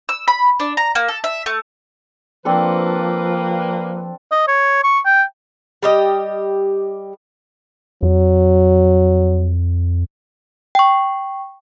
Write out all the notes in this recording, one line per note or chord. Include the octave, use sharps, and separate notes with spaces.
E6
B5
D4
A#5
A#3
A4
E5
A3
F3 A#3 C4 D4 A4 B4
D#5
C#5
C#6
G5
G3 G4 D#5
F2 F#3
G5 C#6